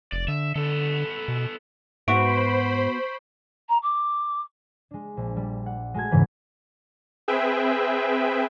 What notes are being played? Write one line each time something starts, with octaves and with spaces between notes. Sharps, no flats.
F1 D5
D3 E5
D3 B3 A4
B2
G#2 B3 F#4 C5 E5 B5 C#6 D7
A#5
D6
G#3 D4
A#1
G3
F#5
G#3 A3 F#4 A5 G#6
E1 G#2 C#3 E3 B4
C4 G#4 B4 E5 G5